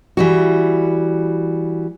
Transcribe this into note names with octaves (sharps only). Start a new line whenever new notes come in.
E3 G3 F#4